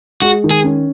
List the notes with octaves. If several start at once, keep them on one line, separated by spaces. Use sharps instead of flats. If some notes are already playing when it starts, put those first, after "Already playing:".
G#3 F#4
D#3
G#4
C#4